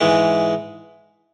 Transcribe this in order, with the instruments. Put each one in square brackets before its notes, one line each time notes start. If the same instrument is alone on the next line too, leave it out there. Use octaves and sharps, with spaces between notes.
[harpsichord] G#2 E3 G#3